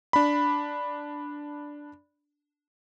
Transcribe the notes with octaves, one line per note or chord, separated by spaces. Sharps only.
D4 B5